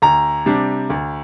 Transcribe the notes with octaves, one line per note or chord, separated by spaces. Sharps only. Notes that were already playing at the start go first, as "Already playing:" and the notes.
D2 A#5
C3 G3 D4
D2